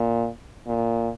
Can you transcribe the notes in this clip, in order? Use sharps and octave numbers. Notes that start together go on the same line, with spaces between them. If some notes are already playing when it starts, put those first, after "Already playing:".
Already playing: A#2
A#2